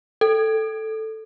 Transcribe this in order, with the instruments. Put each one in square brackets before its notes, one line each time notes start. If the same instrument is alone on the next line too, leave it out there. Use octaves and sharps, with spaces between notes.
[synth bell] A4